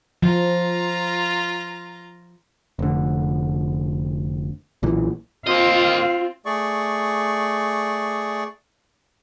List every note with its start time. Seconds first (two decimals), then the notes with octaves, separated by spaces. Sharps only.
0.23 F3 F4 A#5
2.79 F1 D3
4.83 B1 A#2 E3
5.47 A#3 C4 F4 D#5 F5
6.46 A3 G#4 D5 C#6